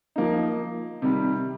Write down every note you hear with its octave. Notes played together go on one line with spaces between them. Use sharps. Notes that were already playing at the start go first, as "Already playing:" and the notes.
F3 A#3 D#4
C3 D#3 G3